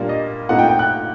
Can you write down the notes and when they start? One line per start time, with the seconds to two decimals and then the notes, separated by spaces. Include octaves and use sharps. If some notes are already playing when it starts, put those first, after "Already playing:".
Already playing: A#2 G3 A#3 D4
0.09 D#5
0.49 A#2 A3 C4 D#4 F#5
0.59 G5
0.69 G5
0.79 F#6